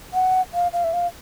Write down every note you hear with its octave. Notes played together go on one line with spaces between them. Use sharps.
F#5
F5
F5
E5
F5